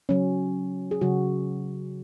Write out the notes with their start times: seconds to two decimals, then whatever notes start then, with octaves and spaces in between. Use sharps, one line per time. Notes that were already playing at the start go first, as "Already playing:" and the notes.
0.09 C#3 F#3 C#4
0.91 G#4
1.01 C#3 F#3 F#4